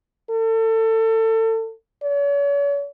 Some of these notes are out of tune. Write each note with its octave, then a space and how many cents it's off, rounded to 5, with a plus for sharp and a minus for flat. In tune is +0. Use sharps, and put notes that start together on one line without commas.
A4 +30
C#5 +40